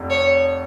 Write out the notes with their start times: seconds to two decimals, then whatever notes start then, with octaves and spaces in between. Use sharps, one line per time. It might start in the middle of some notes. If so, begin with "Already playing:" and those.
Already playing: F1 F2
0.10 C#5